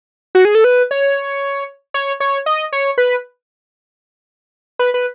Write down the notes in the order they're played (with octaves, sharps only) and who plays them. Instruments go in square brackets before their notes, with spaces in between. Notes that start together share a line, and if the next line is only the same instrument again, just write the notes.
[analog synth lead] F#4
G#4
A4
B4
C#5
C#5
C#5
D#5
C#5
B4
B4
B4